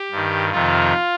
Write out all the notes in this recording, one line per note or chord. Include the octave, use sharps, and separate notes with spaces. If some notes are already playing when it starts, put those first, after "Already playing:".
Already playing: G4
G2 D#3
F2 C3 D#3 F4